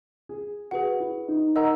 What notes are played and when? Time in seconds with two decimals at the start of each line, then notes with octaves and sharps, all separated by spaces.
0.29 G#4
0.71 F#4 G#4 B4 F#5
1.00 E4
1.28 D#4
1.56 A#4 D#5 F#5 A#5 E6